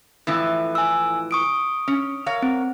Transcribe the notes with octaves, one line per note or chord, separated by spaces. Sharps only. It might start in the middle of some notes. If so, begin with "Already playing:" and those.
F2 A2 E3
G#5 E6
C#6 D#6 D7
C#4
A#4 C#5 F5
C4